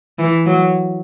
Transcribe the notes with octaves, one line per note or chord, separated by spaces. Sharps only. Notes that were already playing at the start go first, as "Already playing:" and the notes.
E3
F#3